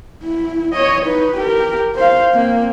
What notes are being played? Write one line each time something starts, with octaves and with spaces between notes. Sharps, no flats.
E4
C#5 D#5
D#4 B4
G4 A#4
C5 F5
A#3 C4